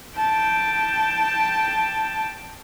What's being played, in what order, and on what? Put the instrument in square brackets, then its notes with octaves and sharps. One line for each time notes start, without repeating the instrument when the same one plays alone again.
[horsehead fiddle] G5 A5